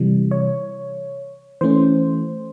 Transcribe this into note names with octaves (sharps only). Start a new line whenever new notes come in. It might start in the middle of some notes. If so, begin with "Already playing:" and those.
Already playing: C3 E3 G3
C#5
E3 A3 C#4 C5